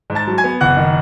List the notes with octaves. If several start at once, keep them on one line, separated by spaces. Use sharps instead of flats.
G#2
A5 A6
F#3
G#5 G#6
B3
F#1 F#5 F#6
D#3